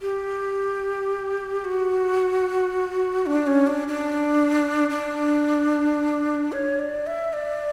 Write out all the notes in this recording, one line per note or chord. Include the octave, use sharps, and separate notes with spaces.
G4
F#4
D4
C#4
D4
D4
D4
C#5
D5
E5
D5